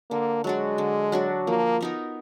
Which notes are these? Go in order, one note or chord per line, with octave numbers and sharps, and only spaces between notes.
D3 A#3
F#3 G#3 D4 F#4
D3
F#3 D4 F#4
F3 A#3
B3 D#4 A#4